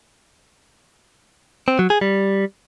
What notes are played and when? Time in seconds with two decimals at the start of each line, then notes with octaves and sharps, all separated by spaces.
1.68 C4
1.79 F#3
1.90 G#4
2.01 G3